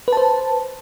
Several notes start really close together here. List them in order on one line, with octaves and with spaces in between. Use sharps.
B4 A5 C5